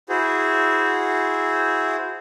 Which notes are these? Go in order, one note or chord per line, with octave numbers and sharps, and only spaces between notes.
E4 F#4 G#4 C5